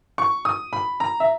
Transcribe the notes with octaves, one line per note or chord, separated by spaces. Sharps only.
C#6
D#6
B5
A#5
E5